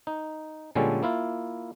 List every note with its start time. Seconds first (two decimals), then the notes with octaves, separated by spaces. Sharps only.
0.07 D#4
0.75 A#2 D3 G3 G#3 C#4 A4
1.03 A#3 E4 F4